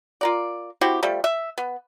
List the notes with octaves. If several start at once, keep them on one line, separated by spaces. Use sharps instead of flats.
F4 A#4 D5
C4 E4 F#4 G4
F3 G3 A3
E5
B3